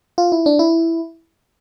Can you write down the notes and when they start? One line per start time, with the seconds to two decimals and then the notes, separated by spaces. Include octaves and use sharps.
0.18 F4
0.32 E4
0.46 D4
0.59 E4